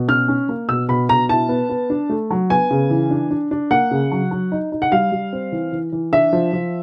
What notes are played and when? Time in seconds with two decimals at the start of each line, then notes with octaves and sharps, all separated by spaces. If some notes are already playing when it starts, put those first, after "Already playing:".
Already playing: B2
0.08 C#4 F6
0.28 C#4
0.49 A#3
0.69 B2 E6
0.89 B2 B5
1.09 B2 A#5
1.29 E4 A5
1.49 B3
1.69 B3
1.90 D4
2.10 A3
2.30 F#3
2.50 B3 G#5
2.71 C#3
2.90 E3
3.11 D4
3.30 D4
3.51 D4
3.71 A#3 F#5
3.91 C#3
4.11 F#3
4.31 F#3
4.52 D#4
4.72 D#4
4.82 F#5
4.92 G3 F5
5.12 G3
5.33 C4
5.52 E3
5.72 E3
5.92 E3
6.13 D4 E5
6.33 F3
6.53 F3